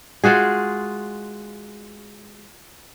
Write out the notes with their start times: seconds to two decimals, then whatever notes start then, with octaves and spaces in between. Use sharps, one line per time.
0.24 G#3 F4 F#4 G#4